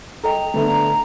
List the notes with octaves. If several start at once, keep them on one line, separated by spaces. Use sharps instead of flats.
A4 D#5 G5 A#5
D3 A3 B3 E5